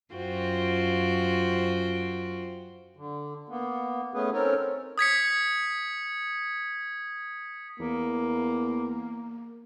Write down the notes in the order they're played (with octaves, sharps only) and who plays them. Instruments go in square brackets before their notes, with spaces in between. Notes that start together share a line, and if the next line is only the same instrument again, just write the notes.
[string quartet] F#2 F4 F#4 C5 G5
[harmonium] D3
A#3 B3
A3 B3 C#4 G#4 B4
C4 C#4 D#4 A4 A#4 C#5
[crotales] D#6 G#6 B6 C#7
[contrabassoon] E2 [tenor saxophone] A#3